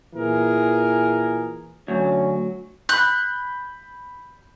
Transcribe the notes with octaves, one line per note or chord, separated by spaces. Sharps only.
A#2 E3 G#4 A#4
D2 F#3 C#4
B5 F#6 G6